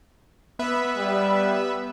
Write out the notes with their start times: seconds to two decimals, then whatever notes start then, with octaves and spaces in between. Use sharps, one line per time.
0.59 B3 B4 E5
0.97 G3